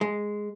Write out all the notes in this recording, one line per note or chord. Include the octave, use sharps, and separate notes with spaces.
G#3